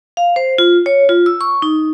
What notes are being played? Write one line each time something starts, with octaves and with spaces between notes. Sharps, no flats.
F5
C5
F4
C#5
F4
E6
C#6
D#4